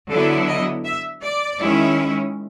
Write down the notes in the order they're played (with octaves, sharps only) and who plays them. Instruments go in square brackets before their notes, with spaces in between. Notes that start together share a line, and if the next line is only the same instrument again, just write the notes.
[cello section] D3 F#3 B3 E4 A4
D#5
E5
D5
D#3 G#3 C#4 E4